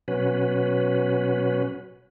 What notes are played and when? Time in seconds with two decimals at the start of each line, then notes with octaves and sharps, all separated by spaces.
0.08 B2 F#3 C#4 B4